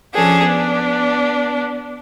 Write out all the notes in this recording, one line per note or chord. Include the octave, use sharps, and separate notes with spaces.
F3 C#4 D4 G#4 A4
B3 D4